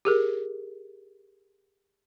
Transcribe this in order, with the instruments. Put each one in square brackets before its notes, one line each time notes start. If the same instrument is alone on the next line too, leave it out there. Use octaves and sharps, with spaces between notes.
[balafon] G4 G#4 A#4